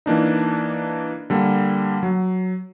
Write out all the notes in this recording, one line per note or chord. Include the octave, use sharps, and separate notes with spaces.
E3 A#3 D4 D#4
D3 G3 A#3
F#3